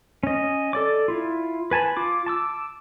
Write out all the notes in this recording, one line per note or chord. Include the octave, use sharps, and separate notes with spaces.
C#4 D#5
A4 D5 D6
E4 F4
B4 G#5 A5 B5
F4 D6
A5 D6 E6